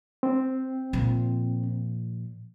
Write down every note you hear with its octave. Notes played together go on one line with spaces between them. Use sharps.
C4
A#2 F3